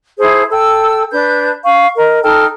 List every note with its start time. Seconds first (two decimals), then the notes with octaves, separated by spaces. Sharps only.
0.19 E4 G#4 C5 A5
0.51 A4 G5 E6
1.10 D4 B4 G6
1.64 F5 C#6
1.97 A#4 D#5
2.23 D#4 A4 G5 F6